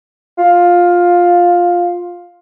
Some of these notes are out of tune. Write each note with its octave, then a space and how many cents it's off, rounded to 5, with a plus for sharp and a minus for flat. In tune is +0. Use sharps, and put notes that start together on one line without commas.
F4 +10